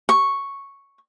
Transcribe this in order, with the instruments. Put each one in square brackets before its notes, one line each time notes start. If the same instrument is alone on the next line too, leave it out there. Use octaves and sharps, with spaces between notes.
[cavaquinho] C#6